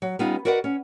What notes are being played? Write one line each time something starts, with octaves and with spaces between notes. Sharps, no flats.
F#3
G3 B3 C#4 D#4 F4
F#4 A#4 B4 D5 D#5 F#5
C#4